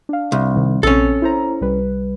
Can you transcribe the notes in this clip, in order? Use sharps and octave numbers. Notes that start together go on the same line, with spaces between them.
D4 F5
C2
C3 D#3
A#1 C4 C#4 A4
E4 C5 A#5
C2 G3 B4